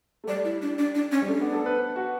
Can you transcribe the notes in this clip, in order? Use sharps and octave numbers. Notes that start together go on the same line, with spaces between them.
A3
G3 D5
E4
D4
D4
D4
C#4
G3
A3 D4
B3
A4
B4
B4
F#4